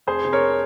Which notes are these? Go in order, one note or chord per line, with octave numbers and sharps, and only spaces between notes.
F1 G#4 C5
C3
A#4 C#5